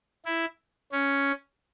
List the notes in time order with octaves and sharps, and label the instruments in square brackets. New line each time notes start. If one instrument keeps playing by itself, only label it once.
[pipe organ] E4
C#4